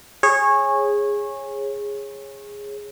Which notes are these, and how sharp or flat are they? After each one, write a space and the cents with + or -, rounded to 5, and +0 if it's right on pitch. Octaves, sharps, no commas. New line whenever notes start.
G#4 -10 C#5 -20